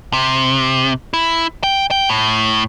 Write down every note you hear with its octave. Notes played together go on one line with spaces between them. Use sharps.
C3
E4
G5
G5
A2